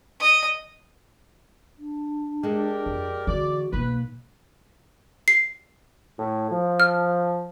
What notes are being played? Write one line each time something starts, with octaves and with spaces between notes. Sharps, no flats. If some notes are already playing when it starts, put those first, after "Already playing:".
D#5
D4
G#3 G4 A4 A#4 D5
F2
D3 E3 F#4 D5
B1 A3 A#3 B4
C7
A2
F3
F6